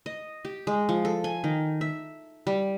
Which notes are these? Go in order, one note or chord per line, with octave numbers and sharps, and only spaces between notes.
D#5
G4
G#3
F3
A4
G#5
D#3
E5
G3